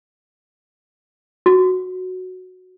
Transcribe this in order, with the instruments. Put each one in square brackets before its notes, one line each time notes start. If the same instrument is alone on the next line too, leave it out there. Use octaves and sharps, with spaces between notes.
[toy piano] F#4